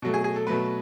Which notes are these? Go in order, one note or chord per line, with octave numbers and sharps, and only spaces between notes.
B2 F#3 A3
G#4
G#4
A4
B2 F#3 A3 B4